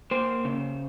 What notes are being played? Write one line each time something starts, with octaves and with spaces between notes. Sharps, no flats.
A#3 C5
C#3